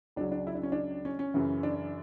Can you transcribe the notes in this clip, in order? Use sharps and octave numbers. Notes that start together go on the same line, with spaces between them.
C#2 C#3 F#3 D4
D4
E4
D4
C#4
D4
C#4
C#4
F#2 C#3 E3
D4